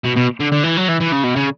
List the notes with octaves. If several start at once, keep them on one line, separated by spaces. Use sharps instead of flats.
B2
B2
D3
D3
E3
F#3
E3
E3
C#3
B2
C#3